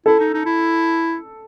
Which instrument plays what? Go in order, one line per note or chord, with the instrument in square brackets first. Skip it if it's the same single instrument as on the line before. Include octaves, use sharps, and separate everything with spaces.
[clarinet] E4 [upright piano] A4
[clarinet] D#4
D#4
E4